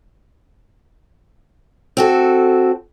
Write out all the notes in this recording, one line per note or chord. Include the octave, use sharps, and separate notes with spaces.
C4 F#4 A4